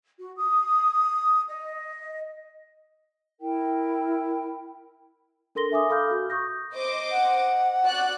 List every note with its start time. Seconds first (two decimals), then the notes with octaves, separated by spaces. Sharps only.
0.18 F#4
0.36 D#6
1.48 D#5
3.40 E4 A#4 G5
5.55 D4 A4 A#4 C6 A#6 G7
5.72 E5 G#5 D6 D#6
5.89 A4 F5 B5 D6 F6 G6
6.11 F#4
6.30 C#6 D#6 G6 A#6
6.74 C5 D#5 D6
7.11 F#5
7.85 F#4 D5 F#6